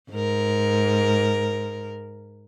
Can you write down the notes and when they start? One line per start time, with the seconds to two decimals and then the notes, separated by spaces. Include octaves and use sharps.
0.11 G#2 A#4